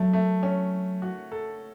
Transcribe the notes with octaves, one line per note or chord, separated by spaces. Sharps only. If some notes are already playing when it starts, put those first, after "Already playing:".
Already playing: F#3 A3
A3
C#4
F#4
A4